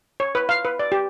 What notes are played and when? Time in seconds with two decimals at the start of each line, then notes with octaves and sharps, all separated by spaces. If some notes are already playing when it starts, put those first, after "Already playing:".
0.20 C#5
0.35 B4
0.49 F5
0.65 B4
0.79 D5
0.92 G4